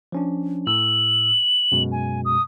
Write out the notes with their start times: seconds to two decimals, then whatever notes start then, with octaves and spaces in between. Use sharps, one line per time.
0.12 F3 C#4 D4
0.67 A2 E6 F#7
1.72 F#2 B2 G#3
1.92 G#5
2.25 D#6